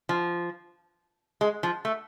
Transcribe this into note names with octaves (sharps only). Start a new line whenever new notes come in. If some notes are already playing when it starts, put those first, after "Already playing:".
F3
G#3
F3
A3